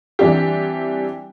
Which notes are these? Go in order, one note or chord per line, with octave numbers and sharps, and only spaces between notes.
E3 G3 C4 D4 G4